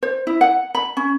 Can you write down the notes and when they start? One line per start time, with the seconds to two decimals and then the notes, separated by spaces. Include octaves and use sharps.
0.03 C5
0.27 E4
0.41 F#5
0.75 B5
0.97 C#4